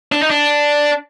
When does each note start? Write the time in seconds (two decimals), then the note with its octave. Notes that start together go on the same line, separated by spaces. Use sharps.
0.12 D4
0.22 D#4
0.31 D4